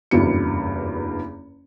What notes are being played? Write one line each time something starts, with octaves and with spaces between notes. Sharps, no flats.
F#1 E2 G2 F#3 C#7